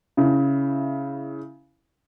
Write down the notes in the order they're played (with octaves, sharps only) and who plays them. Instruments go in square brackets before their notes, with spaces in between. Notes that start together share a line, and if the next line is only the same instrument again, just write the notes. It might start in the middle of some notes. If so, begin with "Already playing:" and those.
[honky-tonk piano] C#3 E4